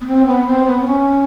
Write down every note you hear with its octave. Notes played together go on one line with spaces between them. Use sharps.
B3
C4
B3
C4
B3
C4
C#4